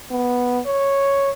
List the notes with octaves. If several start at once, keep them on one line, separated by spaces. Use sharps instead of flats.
B3
C#5